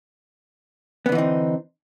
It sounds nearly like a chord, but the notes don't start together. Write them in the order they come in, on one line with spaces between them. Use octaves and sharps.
B3 D3 E3 D#4 C4